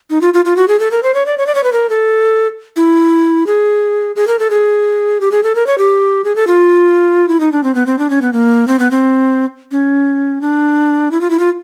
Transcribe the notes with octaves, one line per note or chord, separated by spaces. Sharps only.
D#4
F4
F4
F4
F#4
G#4
A4
A#4
C5
C#5
D5
C#5
D5
C#5
B4
A#4
A4
E4
G#4
G#4
A#4
A4
G#4
G4
G#4
A4
A#4
C#5
G4
G#4
A4
F4
E4
D#4
D4
C4
B3
C4
D4
C#4
B3
A#3
C4
B3
C4
C#4
D4
E4
F4
E4
F4